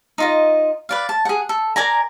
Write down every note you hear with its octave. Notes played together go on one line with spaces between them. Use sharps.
D#4 F4 D#5
B4 D5 F5
A5
G#4 F#5
A4
A#4 D5 G#5 A#5